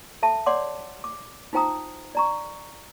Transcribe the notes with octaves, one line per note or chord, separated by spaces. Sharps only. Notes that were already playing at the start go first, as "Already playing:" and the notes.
A4 E5 A5
C#5 D5 F#5 C6 D6
D6
D#4 F4 C5 G5 A#5 D#6
D5 A#5 C#6